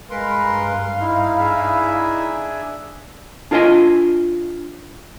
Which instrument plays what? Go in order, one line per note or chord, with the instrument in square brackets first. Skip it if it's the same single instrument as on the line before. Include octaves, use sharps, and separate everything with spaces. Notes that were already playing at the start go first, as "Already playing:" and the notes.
[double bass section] G2 [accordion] G#3 A#4 B4 [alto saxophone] F5 [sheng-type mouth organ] C6
[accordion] D#4 E4
[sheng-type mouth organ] D4 G#4 E5
[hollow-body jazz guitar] D4 F4 A#4 D#5 G#5 C6